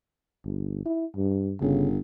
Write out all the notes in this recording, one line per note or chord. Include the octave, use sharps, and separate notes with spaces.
G1
E4
G2
G1 C#3